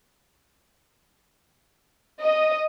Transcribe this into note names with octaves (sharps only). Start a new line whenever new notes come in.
D#5